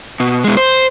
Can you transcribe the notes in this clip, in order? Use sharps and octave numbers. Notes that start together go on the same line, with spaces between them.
B2
B2 G#3
C5